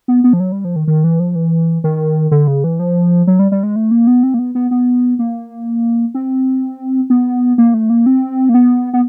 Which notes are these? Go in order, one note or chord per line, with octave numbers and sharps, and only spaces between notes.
B3
B3
F3
F#3
G3
F3
D#3
D#3
E3
F3
E3
D#3
D3
C#3
E3
F3
F#3
G3
G3
G#3
A3
A#3
B3
C4
A#3
B3
B3
B3
A#3
C4
B3
A#3
A3
A#3
C4
A#3
B3
B3